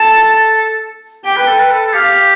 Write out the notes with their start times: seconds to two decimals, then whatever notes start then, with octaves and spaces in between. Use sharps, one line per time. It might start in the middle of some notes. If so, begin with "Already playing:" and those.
Already playing: A4 A5
1.24 G4 G5
1.37 B4
1.47 A4
1.60 B4
1.71 A4
1.86 A4
1.93 G4 F5